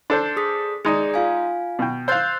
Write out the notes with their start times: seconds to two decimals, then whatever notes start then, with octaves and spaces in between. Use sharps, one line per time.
0.10 D4 A4 C5
0.37 G#4 D#6 B6
0.85 G#3 D#4 G#4 D5
1.14 F4 F5 G#5
1.79 B2 G5
2.08 C5 F5 E6 F#6 A6